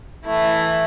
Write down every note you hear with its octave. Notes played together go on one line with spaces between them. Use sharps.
E3 A3 E4